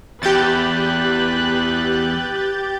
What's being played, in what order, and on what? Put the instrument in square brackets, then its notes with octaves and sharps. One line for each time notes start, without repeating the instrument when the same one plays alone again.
[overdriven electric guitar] E2 [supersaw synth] G4 G6 A6 [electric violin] B4 F#6